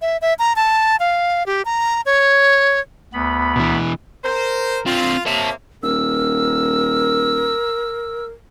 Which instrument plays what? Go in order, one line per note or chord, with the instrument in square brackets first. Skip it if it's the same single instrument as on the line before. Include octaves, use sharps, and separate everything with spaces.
[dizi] E5
E5
A#5
A5
F5
G4
A#5
C#5
[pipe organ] D2 B3 B5
[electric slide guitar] B2 E3
[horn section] A#4 C5
[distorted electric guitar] D3 C4 [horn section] F4
[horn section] C3 A#3 [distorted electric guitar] C#5 A5
[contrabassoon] D#1 [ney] A#4 [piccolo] E6